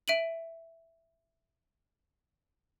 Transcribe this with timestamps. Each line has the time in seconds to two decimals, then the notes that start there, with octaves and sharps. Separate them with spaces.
0.08 E5 D7 D#7 F#7